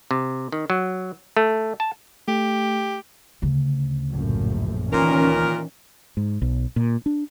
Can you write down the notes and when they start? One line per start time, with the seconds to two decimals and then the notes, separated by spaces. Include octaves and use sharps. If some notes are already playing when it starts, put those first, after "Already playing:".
0.11 C3
0.52 D#3
0.70 F#3
1.37 A3
1.80 A5
2.28 A3 G4
3.42 D2 C#3
4.12 A#1 F#2 A2
4.92 D2 A#2 D#3 E3 C#4 A#4
6.17 G#2
6.42 B1
6.76 A#2
7.06 D4